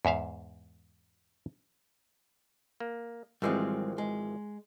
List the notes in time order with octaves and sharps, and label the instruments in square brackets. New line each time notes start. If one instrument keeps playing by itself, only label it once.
[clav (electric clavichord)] E2 G#2 E5 F5
A#3
[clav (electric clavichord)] G#1 E3 F3 [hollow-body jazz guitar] G3 G#3 C4
[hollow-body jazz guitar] G#3